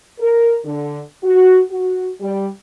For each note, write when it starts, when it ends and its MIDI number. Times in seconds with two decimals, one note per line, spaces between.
0.19 0.56 70
0.65 1.00 50
1.23 1.60 66
1.71 2.09 66
2.21 2.47 55